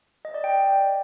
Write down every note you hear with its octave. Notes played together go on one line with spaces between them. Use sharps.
D#5
D5
G5